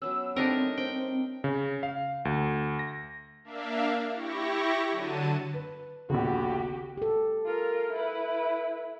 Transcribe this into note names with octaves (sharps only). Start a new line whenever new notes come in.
F#3 B3 C#4 E6
G3 A3 C4 D4 D#4 A#4
C4 G5
C#3
F5
D2
A#6
A#3 D4 E5 F5
E4 G4 C#6 A#6
D3 F#3 A5 D#7
B4
D#1 A#1 C#3 B3 F#4 G4
G4 A4
F4 A#4
E4 B4